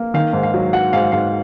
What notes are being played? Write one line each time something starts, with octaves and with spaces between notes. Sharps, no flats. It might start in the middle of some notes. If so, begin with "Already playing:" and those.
Already playing: A#3
D#3 F5
G#2
F5
F#3
F#3 F#5
G#2 F5
G#2 F5